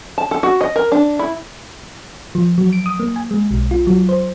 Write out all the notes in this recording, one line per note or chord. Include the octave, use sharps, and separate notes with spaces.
A5
A4
F#4
D#5
A#4
D4
E4
F3
F#3
D7
D#6
A#3
G#5
G#3
B1
F4
F#3
C5